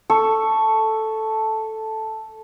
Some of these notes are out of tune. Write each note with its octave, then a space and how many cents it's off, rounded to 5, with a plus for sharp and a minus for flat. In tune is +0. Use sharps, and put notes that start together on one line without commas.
A4 +0 C#6 +0